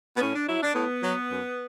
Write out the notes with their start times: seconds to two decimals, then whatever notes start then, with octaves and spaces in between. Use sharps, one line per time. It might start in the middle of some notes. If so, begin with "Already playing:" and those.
0.16 B3
0.21 A2 C#4
0.34 D4
0.47 F#3 E4
0.62 D4
0.75 A2 B3
1.03 F#3
1.30 F#2